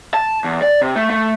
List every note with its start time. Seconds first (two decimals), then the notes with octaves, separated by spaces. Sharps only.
0.14 A5
0.44 E2
0.62 D5
0.82 C3
0.96 A3
1.10 A3